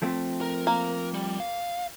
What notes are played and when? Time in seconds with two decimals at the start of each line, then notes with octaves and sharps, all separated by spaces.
0.02 F3 A3 C4
0.41 A#4
0.67 A#3
1.14 G3
1.40 F5